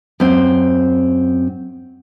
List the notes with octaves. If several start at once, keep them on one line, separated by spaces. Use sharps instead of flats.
F#2 C4